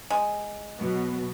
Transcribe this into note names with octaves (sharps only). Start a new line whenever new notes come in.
G#3
B2 F#3 B3